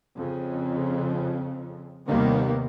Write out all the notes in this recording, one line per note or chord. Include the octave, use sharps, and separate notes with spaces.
F2 C#3
D#2 C3 D#3 G3 A#3 B3